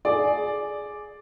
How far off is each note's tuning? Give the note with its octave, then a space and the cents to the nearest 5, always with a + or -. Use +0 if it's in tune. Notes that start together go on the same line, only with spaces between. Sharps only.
G#4 +10 D5 +0